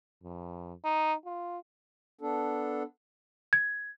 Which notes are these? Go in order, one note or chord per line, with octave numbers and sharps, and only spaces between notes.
F2
D#4
F4
B3 D4 A4
G#6